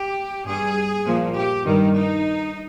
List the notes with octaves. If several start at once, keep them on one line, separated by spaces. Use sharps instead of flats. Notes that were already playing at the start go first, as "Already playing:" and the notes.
Already playing: G4
G2 G3 G#4
A#2 F3
G4
G2 D#3 G3
D#4